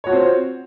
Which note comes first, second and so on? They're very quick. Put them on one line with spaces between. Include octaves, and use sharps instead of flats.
C#5 F#4 F4 C4 C5